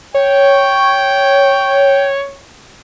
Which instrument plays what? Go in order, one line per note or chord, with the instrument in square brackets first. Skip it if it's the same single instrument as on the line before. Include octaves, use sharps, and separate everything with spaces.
[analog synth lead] C#5 [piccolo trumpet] G5